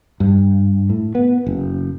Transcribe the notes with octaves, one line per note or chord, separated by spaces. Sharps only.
G2
A2
B3
F#1